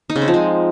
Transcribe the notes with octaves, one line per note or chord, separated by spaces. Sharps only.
D#4
C#3
C4
F3
G#3